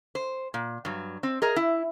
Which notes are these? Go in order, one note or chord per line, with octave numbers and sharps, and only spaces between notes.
C5
A#2
G2 F#3
C4
G#4 A#4 D#5
E4